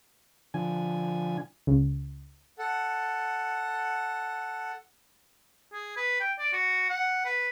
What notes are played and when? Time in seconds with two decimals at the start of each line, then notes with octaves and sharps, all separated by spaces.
0.54 D3 F3 G#5
1.67 C#2
2.59 A4 F#5
5.73 G#4
5.97 B4
6.20 G5
6.39 D5
6.53 F#4
6.89 F#5
7.25 B4